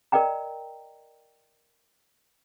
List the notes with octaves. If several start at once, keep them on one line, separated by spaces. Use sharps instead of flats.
A#4 D5 D#5 G5 A#5